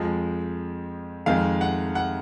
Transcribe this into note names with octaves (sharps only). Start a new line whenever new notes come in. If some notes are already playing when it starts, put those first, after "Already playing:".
Already playing: F2 F3 G#3
F2 D#3 G#3 F5
F#5
F#5